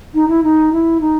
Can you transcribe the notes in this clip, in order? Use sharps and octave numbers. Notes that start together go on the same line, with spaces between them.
D#4
E4
D#4
E4
D#4